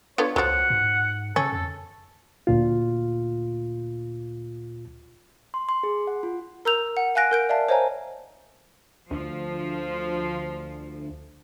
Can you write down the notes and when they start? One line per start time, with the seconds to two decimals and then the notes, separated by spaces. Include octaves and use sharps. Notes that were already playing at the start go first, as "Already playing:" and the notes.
0.18 D3 B3 F4 C#5
0.36 C#2 F3 F#3 F#5
0.70 G#2
1.36 C#3 C#4 A4
1.53 F2 A4
2.47 D2 A#2 F4
5.54 C6
5.69 C6
5.83 G#4
6.07 F#5
6.23 F4
6.65 A#4 A#5 E6 G6 F7
6.97 F#5
7.15 F5 G#5 F#6 A#6 D7
7.31 A#4 G6 D7
7.49 D5 E5 F5 A5
7.69 C5 C#5 D#5 F5 G#5 A#5
9.11 D2 F3